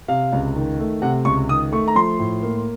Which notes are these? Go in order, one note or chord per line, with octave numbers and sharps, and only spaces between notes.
C3 F5
C#2
D#3
A3
C3 F#5
C#2 C#6
D#3 D#6
A3 C#6
A#5
F3 C6
A2
A#3